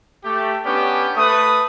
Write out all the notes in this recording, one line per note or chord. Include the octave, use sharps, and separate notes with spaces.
A3 G4
B3 C#4 D4 G4
A3 B4 D#6